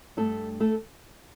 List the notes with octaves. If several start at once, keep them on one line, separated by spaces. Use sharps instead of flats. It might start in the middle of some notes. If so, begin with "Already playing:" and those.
G2 A3 A4
A3 A4